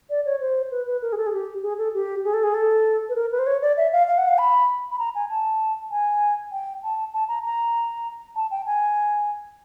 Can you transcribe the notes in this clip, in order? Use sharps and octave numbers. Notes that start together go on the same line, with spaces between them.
D5
C#5
C5
B4
B4
A#4
G#4
A4
G#4
G4
G#4
A4
G4
G#4
A4
G#4
A4
B4
A#4
B4
C5
C#5
D5
E5
F5
F5
F#5
F5
B5
B5
A#5
G#5
A5
G#5
G5
A5
A5
A#5
A#5
A5
G5
G#5